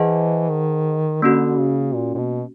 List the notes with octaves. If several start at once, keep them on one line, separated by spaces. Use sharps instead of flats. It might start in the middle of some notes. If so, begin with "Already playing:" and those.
Already playing: E3 G#4 C5 D#5 F#5 A5
D#3
D3 A#3 C#4 F#4
C#3
A#2
A#2
B2